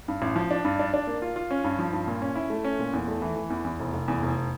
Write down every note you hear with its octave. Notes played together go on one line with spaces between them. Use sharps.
G2
A1
F3
D4
G2
D4
D4
A#3
F4
F4
C#4
G2
F3
G2
A#2
C#4
E4
A3
C#4
A#2
E2
A3
E3
E3
E2
E2
F1
F1
E2
F1